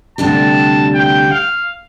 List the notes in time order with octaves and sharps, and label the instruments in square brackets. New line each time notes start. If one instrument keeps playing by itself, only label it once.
[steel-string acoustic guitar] D2 C3 G3 D4 G4 [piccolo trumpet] A5
[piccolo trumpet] G5
F5